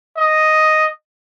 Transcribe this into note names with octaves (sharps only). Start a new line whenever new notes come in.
D#5